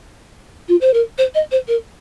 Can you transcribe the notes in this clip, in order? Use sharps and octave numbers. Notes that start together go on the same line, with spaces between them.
F4
C5
A#4
C5
D#5
C5
A#4